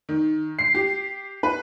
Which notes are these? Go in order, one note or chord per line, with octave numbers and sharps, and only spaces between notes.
D#3
C7
G4
B4